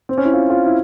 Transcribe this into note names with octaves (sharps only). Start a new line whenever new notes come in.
C4
C#4
E4
F4
F4
E4